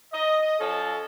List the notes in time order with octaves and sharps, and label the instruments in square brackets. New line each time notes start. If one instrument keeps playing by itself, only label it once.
[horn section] D#5
F3 C#4 A4